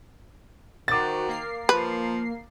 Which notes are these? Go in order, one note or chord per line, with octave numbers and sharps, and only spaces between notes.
D#3 F#4 C5 D6 A6
A#3 A#4 C7
F3 B4